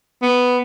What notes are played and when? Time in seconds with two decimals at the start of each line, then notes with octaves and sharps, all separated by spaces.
0.22 B3